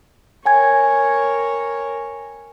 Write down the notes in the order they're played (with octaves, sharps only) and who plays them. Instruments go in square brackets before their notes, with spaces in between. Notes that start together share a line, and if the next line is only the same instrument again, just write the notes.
[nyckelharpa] A#4 C#5 [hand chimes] G5 G#5 G#6